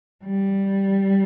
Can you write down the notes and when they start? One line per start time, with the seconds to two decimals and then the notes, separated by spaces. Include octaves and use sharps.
0.25 G3